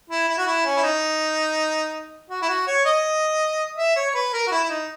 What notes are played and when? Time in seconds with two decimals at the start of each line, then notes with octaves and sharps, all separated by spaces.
0.10 E4
0.28 E4
0.38 F#4
0.47 E4
0.65 C#4
0.77 E4
0.83 D#4
2.30 F#4
2.42 E4
2.49 F#4
2.67 C#5
2.86 D#5
3.78 E5
3.96 C#5
4.10 C#5
4.14 B4
4.33 A#4
4.47 F#4
4.52 E4
4.64 E4
4.69 D#4